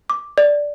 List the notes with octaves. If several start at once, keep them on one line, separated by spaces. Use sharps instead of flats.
D6
D5